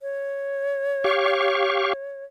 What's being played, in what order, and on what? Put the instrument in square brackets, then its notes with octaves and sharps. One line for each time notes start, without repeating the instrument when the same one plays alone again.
[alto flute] C#5
[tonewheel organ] G4 F5 C#6